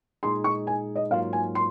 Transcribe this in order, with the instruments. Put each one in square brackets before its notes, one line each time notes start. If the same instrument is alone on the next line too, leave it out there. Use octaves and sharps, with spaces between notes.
[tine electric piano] A#2 G#3 D#4 G#4 [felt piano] C6
[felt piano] C#6
G#5
D#5
[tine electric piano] G#2 F#3 A#3 F4 [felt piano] F5
[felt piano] G#5
C6